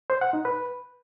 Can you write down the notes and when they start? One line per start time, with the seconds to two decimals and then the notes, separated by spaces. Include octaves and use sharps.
0.10 C5
0.21 F#5
0.33 D#4
0.45 B4